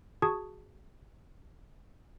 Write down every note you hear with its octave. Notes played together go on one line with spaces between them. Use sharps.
F#4 G#4 A5 C#6 D#6 G#6